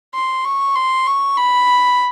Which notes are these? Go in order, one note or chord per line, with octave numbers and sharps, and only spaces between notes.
C6
C#6
C6
C#6
B5